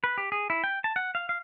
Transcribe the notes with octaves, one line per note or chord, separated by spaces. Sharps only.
B4
G4
G#4
E4
G5
A5
F#5
F5
F5